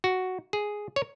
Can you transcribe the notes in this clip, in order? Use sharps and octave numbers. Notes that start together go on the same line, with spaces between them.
F#4
G#4
C#5